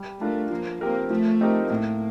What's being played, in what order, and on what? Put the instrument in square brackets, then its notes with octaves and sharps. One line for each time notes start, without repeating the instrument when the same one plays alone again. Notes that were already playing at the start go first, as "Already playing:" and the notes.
Already playing: [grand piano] G3
[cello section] A3 [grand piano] D4 F4 A#4
[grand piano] F3 [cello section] A#3
[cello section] A#3 [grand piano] C4 G4 A#4
[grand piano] F3 [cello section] A3
[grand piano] C4 D#4 G4 A#4
[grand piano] A2 [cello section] A#3